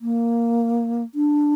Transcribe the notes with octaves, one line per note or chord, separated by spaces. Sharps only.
A#3
D4